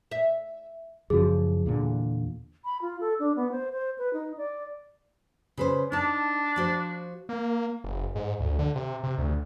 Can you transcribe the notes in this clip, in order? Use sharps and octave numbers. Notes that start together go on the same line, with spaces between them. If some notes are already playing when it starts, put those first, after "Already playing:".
E5
F#2 C#3 F3 F#4 G#4
E2 A#2 D3
B5
F4
A4
D4
B3
C5
C5
B4
D#4
D5
C#3 B4 C5
D4 D#4 A5
F3 F#4 C5
A#3
F#1
G#2
D2
D3
C3
C3
D2